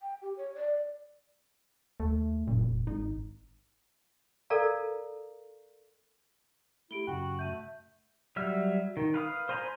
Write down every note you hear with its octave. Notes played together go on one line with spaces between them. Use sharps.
G5
G4
C#5
D5
D#2 A3
F#1 A#2
F1
G#1 D#4
A4 A#4 D5 F5 A#5
A3 E4 G4 D7 G7
F#2 C#3 F#4 G5 F#6
A3 G6 D#7
F#3 G3 E5 F6
D#3
B4 F5 D#6
C5 G#5 A#5 B5